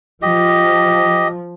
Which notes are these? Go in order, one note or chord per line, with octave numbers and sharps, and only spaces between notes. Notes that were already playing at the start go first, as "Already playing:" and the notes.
F3 G4 D#5